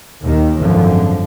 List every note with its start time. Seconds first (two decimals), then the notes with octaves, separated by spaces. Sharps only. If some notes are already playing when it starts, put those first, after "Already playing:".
0.20 D#2 D#3
0.60 G#1 F#2 D3 F3